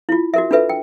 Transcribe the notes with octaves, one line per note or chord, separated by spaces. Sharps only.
E4 F4
F#4 A#4 E5
D4 F4 A4 B4 E5
G5